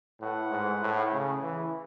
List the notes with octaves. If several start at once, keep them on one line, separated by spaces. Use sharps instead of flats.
A2 E4 B4 F#5
G#2
A2
C#3
E3